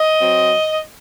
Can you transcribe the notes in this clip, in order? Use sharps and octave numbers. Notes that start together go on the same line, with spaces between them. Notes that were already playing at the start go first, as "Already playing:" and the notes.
Already playing: D#5
F#3 C4